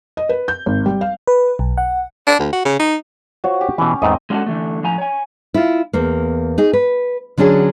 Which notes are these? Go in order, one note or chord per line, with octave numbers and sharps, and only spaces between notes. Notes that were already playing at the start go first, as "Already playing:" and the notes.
D#5
B4
G6
G#1
G3
F5
B4
B1
F#5
D4
D2
F#4
C#3
D#4
F4 F#4 C5 C#5
G4
B2 E3 C#4
E2 G#2 A3 C4 D#5
G#3 C#4 D4 F4 F#4 A4
D3 E3 A3
A2 F3 G#5 A#5
C#5 G#5
E4 F4
E2 A#3
D#4 G#4
B4
D3 F#3 C#4 D4 G#4